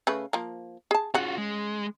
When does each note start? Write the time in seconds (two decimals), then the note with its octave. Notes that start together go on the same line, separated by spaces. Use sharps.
0.07 C#3 A3 B4
0.33 F3 A#3
0.91 G#4 A5
1.14 C#3 F4 F#4 F#5
1.38 G#3